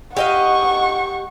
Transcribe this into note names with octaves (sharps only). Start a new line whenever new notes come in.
G4 D#5 F5 F#5 C#6